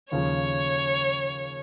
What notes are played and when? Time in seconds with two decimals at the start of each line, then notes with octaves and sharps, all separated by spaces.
0.11 D#2 C#3 F3 C#5